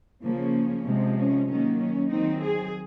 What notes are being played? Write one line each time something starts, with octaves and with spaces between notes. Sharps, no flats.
C#3 F3 A#3 C#4
C3 F3 G#3
C#4
D#3 F#3 A#3 C#4
C#4
D#3 F#3 C4 D#4
G#4